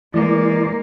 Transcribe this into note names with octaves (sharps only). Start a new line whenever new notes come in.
E3 G#3 A#3 D5